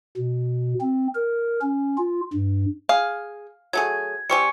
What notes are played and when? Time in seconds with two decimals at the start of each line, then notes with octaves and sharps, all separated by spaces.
0.17 B2
0.81 C4
1.15 A#4
1.62 C#4
1.97 F4
2.33 G2
2.89 G#4 F5
3.73 F#3 A3 G#4 G#6
4.30 G3 C4 G4 G#5 C#6 C#7